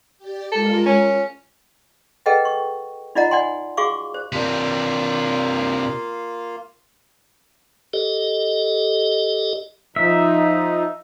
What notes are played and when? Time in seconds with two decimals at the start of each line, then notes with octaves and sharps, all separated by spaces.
0.18 G4 D5
0.52 G#3 F4 A4 A#4
0.86 C#4
2.26 G#4 A4 B4 D#5 F#5 G5
2.45 C#6
3.15 D#4 F4 D5 D#5 F#5 A#5
3.31 D5 F#5 G#5 C6
3.77 F#4 G#4 F5 C#6 D6
4.14 C5
4.32 C3 A#3 D4 F4
7.93 G4 A4 D#5
9.96 F3 D#4 E5